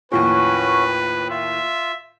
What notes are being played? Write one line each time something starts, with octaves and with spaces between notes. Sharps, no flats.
D#2 A2 F3 C#4 F#4 B4
F4 E5